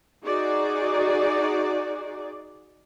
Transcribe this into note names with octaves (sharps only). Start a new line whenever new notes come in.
D#4 F#4 G#4 D5